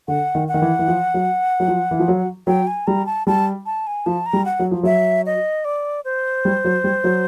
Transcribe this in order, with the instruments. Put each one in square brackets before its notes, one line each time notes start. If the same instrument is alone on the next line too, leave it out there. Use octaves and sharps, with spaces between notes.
[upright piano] D3 [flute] F#5
[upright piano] D#3
[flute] F#5
[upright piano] D#3
E3
E3
F3
F#3
F#3
F3
E3
F3
F#3
[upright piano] F#3 [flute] G5
[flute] G#5
[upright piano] G3 [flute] A#5
[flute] A5
[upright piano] G3 [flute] A5
[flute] A5
G#5
[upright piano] F3 [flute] A5
[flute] A#5
[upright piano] G3
[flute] F#5
[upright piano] F#3
F3
[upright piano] F#3 [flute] E5
[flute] D#5
D5
C5
[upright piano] G3
F#3
G3
F#3